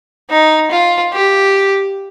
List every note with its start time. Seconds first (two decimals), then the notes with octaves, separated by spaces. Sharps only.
0.30 D#4
0.71 F4
1.13 G4